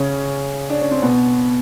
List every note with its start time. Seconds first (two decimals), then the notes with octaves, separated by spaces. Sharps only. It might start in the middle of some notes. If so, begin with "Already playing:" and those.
Already playing: C#3 C#4
0.70 D4
0.81 C#4
0.91 C4
1.02 B2 B3